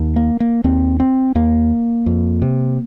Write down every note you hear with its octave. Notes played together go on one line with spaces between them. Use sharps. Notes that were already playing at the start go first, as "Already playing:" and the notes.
Already playing: D#2
A#3
A#3
D#2 C4
C4
D#2 A#3
F2
C3